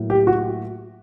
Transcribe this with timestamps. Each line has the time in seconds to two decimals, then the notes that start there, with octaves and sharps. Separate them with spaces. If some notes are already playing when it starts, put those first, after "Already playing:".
Already playing: A2 F#3 A#3
0.10 G4
0.27 F#4